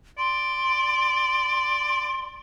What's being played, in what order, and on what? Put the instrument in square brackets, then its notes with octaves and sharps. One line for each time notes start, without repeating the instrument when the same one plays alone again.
[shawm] D5 [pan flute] C6